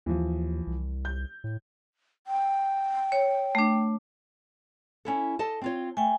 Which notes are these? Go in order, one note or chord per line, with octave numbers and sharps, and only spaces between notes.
D#2 E3 F3
C2
G6
A2
G5
C#5
A3 D4
C#4 E4 A4
A4 D#5 A5
C4 F4 C#5
A3 G5 G#5